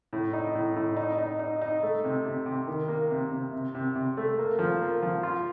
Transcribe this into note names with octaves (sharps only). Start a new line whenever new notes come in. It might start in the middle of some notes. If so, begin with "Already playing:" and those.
A2
D#4
A2
A2
D#4
D#4
D#4
D#4
A3
C3
C3
C3
D#3
A#3
C3
C3
C3
C3
C3
A3
A#3
F3
A#3
F3
F4